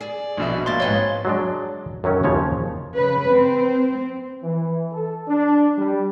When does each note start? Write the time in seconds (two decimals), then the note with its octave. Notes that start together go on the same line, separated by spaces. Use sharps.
0.01 G#4 D5
0.37 A#1 B2 E5
0.66 F3 A#3 C6 A6
0.80 G#2 B3 C4 C#5 D#5
1.25 F#3 G#3 D4
2.04 F#2 D#3 F#3 C#4
2.23 D#2 C#3 F3 C#5
2.95 C#3 B4
3.29 C4
4.43 E3
4.92 A4
5.27 D4
5.78 G3